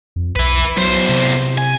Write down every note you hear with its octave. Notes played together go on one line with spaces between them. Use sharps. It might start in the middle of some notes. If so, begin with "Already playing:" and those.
F2
B1 E4 B4
E2 F#3 C5
C3
G#5